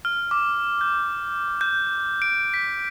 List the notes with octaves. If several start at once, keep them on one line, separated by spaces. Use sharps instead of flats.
F6
D6
G6
G6
D7
B6